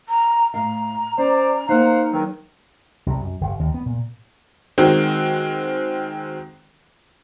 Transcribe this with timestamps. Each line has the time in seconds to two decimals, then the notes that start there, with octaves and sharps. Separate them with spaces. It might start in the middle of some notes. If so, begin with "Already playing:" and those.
0.09 A#5
0.54 A2 F5 A#5
1.18 C#4 C5 D5
1.69 A#3 D#4 C5 F5 F#5
2.12 E2 D#3 F#3
3.07 C2
3.21 F#2
3.41 G1
3.59 D#2
3.74 B3
3.86 A#2
4.78 D#3 G#3 C4 F#4